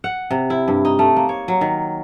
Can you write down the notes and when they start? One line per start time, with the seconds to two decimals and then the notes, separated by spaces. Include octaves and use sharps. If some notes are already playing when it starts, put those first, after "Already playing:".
0.04 F#5
0.31 C3
0.50 E4
0.68 G2
0.85 D#4
0.99 A3
1.17 A#3
1.29 C#5
1.48 F#3
1.61 D#3